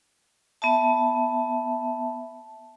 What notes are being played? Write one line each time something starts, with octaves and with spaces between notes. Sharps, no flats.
B3 E5 A5